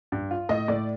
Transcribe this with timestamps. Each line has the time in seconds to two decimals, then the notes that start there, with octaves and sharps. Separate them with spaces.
0.12 G2
0.31 F4
0.49 A2 D#5
0.68 A2 D5